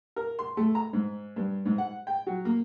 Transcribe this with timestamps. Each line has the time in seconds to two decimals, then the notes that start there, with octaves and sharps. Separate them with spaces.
0.16 A#4
0.39 C6
0.57 A3
0.75 A#5
0.93 G#2
1.36 G2
1.65 G#2
1.78 F#5
2.07 G5
2.27 F#3
2.45 A#3